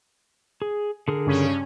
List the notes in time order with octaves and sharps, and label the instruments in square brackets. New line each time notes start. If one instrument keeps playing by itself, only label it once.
[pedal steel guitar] G#4
D3 G#4 A#4
[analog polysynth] G2 C#3 C#4